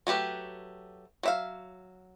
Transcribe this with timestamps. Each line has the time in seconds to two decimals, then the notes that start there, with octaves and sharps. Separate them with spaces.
0.07 F#3 A3 G4 B4
1.23 F#3 E5 F5